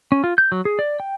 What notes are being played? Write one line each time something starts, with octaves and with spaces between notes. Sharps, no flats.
C#4
F4
G6
F#3
G#4
D5
G5